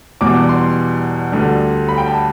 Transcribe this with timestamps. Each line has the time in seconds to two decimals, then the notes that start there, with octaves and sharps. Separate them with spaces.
0.21 E2 B2 G3 D6
0.49 C6
1.32 D2 D3 G3
1.89 B5
1.98 G5
2.08 A5